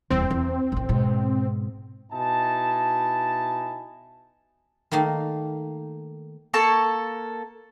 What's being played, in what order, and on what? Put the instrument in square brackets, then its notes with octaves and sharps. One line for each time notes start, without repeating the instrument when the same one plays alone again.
[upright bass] D#1 E2 [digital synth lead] C4
[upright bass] E2
A1 D#3
G#2 B2
[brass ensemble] B2 D#4 E4 G#5 A5
[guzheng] D#3 A3 A#3 D#4
[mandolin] A#3 A4 A5 C#6